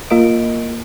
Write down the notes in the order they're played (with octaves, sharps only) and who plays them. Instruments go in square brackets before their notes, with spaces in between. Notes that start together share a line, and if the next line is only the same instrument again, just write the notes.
[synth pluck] A#3 F4 A#4 D#5 D7